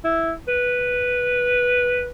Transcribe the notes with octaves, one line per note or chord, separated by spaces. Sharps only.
E4
B4